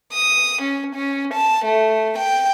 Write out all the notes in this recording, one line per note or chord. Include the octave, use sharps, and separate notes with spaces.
D#6
C#4
C#4
A5
A3
G5